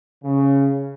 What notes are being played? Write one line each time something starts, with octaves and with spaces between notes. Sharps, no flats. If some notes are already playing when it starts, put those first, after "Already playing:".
C#3